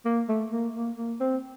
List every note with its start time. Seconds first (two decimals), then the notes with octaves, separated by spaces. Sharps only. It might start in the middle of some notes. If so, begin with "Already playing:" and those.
0.05 A#3
0.29 A3
0.51 A#3
0.75 A#3
0.97 A#3
1.20 C4